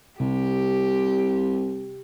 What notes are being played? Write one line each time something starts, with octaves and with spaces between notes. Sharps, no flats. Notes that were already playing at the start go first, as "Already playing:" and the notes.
C2 C3 G4